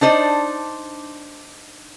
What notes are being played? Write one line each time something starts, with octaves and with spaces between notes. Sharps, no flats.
D4 D#4 C5 D5